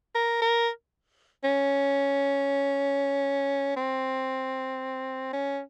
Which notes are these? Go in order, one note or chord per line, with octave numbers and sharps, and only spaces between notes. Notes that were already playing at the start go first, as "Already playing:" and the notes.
A#4
A#4
C#4
C4
C#4